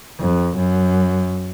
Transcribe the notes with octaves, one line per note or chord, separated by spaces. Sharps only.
F2
F#2